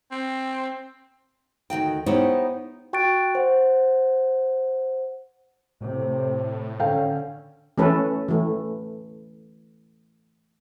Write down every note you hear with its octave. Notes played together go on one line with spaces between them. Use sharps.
C4
D2 D#3 F#4 G5
B3 D#4 E4 G4 C5 C#5
F#4 G5 C#6 F#6 A6 D7
C5 F#5
A2 C3
D3 C#4 A4 F5 G5
E3 A3 C#4 A4 B4
E3 A3